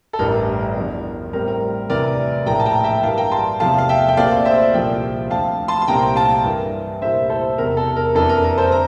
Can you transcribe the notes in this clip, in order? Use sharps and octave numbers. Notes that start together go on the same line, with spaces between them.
A4
A1 G2 E3 G3 D4 A#4
E2 D3 F3
A2 G3 C4 A#4
A#4
D2 C3 E3 A#4 D5
A#1 A2 F3 A#3 E4 G5 A#5
A5
G5 A#5
E5 G5
G2 E3 G3 A#3 F5 A5
G5 A#5
A5 C6
E2 C3 F3 A3 F5 A5
F5
E5 G5
G5
A#1 A#2 A3 C4 F4 D5 F5
C5 E5
C2 A#2 F3 C4 F4 E5 G5
D2 D3 F3 C4 F5 A5
A5 C6
C6
C2 A#2 A3 C4 G5 A#5
F5 A5
G2 E3 A#3
C2 A#2 A3 E4 C5 E5
A4 C5
E1 E2 C3 A#4
A4
A#4
F2 E3 A#3 D4 A4
A#4
A#4
A4 C5
D3 A#5